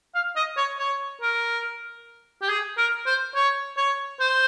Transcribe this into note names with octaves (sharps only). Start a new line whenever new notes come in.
F5
D#5
C#5
C#5
A#4
G4
G#4
A#4
C5
C#5
C#5
C5